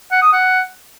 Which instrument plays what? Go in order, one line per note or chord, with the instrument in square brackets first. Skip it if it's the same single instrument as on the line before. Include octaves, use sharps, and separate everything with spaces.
[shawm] F#5
D#6
F#5